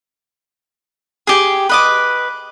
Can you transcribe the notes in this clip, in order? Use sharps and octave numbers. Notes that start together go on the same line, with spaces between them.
G4 G#4
B4 D#5 D6